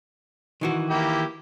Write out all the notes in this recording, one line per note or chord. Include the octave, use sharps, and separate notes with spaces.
D#3 E3 F#4
A#3 E4 G4